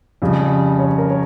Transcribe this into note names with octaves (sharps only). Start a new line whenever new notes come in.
F2 C#3 G3
C#5
A#4
C#5